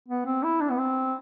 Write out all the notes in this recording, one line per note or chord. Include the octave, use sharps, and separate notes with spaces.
B3
C4
E4
D4
B3
C4